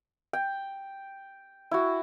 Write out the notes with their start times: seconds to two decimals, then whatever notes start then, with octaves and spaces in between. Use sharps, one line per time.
0.33 G5
1.71 E4 F#4